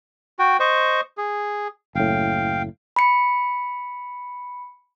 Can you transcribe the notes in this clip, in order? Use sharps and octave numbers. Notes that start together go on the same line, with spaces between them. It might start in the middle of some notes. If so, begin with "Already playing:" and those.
F#4 G5
C5 D#5 C#6
G#4
F#1 A2 F5 G5
B5 C#7